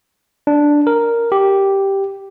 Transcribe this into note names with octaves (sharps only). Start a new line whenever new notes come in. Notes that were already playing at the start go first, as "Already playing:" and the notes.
D4
A#4
G4